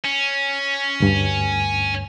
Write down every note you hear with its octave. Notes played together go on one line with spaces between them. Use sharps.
C#4
D2 G2